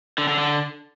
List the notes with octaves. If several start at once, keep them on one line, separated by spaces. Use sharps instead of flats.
D3
D3
D3